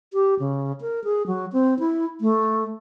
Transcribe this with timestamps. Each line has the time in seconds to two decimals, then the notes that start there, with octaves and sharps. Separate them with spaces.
0.13 G4
0.39 C#3
0.81 A#4
1.04 G#4
1.27 F#3
1.53 C4
1.79 E4
2.21 A3